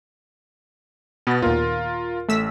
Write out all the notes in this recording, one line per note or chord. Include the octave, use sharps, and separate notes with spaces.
B2 B3 A6
D#2 A#2 F4 A#4
A1 A3 E6 B6